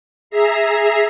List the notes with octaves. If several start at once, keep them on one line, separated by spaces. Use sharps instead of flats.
G#4 E5 A#5 C7